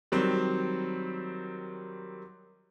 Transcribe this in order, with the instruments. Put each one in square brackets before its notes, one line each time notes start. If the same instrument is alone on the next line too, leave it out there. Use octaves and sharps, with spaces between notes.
[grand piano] D#3 F#3 G3 C4